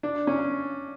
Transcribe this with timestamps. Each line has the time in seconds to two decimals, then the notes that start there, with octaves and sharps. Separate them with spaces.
0.03 D4
0.27 C#4